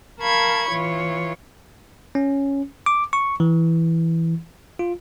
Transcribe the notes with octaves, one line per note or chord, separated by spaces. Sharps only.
A#4 F5 A5 B5 C#6 G#6
E3 F4 C#5
C#4
D6
C#6
E3
F4